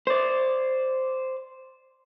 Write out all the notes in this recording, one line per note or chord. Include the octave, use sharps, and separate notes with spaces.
C5 D5